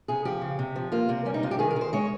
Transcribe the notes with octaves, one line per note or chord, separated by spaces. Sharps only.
C3 G#4
F3 G4
C#3
C3
F3
A#3 F4
C3 C4
G3 C#4
D#4
C3 F4
G4
D#3 G#4
A#4
D#3 C5
G#3 C#5